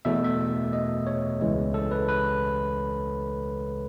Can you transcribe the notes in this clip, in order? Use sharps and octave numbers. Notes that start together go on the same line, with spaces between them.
E2 B2 A3 E5
E5
D#5
C#5
C#2 C#3 E3 G#3
A4
B4
B4